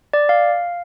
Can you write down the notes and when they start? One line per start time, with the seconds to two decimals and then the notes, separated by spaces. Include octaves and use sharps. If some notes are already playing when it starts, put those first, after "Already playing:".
0.13 D5
0.29 F5